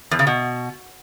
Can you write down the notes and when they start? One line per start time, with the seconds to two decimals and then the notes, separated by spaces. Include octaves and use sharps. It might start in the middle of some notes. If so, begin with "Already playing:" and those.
0.11 E2
0.19 C#3
0.27 B2